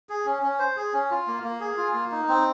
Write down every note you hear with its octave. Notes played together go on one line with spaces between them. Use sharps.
G#4
C#4
C#4
C5
G#4
C#4
F4
A#3
A#3
G#4
F4
A#3
D#4
C4